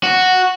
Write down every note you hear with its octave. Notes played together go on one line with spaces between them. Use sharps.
F#4